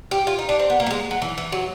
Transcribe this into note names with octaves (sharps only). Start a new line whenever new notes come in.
G4
F4
D#4
D4
C4
B3
A#3
G3
G#3
F#3
E3
E3
F#3